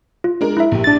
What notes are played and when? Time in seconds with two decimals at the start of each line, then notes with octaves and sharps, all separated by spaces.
0.24 F4
0.41 G#3 D4 A#4
0.57 E4 E5
0.72 A#1 G4
0.84 D4 A6